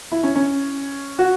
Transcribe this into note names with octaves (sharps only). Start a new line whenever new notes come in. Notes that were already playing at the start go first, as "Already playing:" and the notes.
E4
C#4
C#4
F#4